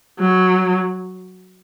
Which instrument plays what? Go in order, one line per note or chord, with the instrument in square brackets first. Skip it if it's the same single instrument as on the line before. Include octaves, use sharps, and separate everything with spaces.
[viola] F#3